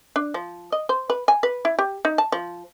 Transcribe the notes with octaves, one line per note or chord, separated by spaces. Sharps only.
D4
F3
D#5
C5
B4
G#5
B4
E4
G4
D#4
A5
F3